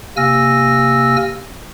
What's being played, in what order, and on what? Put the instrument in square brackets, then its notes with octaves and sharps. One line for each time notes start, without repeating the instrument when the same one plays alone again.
[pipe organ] C3 A#3 G#5 E6 F6 A#6